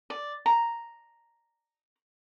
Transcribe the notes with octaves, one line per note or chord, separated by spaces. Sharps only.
D5
A#5